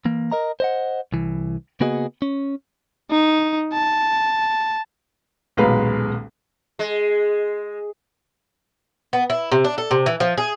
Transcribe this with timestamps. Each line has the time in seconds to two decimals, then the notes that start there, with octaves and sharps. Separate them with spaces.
0.05 E3 A#3
0.32 A#4 D#5 A#5
0.60 C5 D#5 F#5
1.13 C2 E3
1.80 C#3 A#3 B3 F#4 G#4 D#5
2.22 C#4
3.11 D#4
3.73 A5
5.57 D#1 B1 G#3 B4 F5 A#5
6.79 G#3
9.13 B3
9.30 E4
9.52 C3
9.64 D4
9.78 A4
9.91 C3
10.06 E3
10.20 F3
10.38 G#4